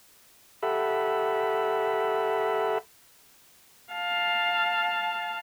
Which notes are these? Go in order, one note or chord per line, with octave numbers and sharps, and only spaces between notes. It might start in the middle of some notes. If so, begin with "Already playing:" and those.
G4 A4 E5 F#5 B5
F5 A5